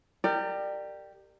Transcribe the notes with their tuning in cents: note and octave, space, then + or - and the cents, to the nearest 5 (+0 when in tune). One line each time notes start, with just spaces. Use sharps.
G4 +0 A#4 -30 D5 +25